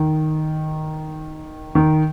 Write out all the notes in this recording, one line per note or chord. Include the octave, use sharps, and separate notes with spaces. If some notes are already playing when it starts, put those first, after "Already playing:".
Already playing: D#3
D#3